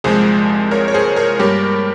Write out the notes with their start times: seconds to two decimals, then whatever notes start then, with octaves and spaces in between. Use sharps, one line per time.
0.04 C2 A#2 F3 G#3 G#4 C5
0.71 A#4 C#5
0.88 C#5
0.94 G#4 C5
1.16 A#4 C#5
1.39 G2 G3 A#3 G4 A#4